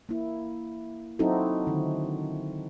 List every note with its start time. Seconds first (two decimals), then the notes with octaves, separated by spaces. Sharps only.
0.09 A#3 E4
1.19 F#3 C4 D#4 E4 F#4 A4
1.67 D3 D#3